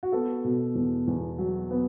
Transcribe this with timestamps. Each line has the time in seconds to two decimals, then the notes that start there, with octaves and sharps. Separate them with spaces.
0.03 F#4
0.12 B3 A4
0.44 B2
0.75 E2
1.07 E2
1.38 F#3
1.71 B3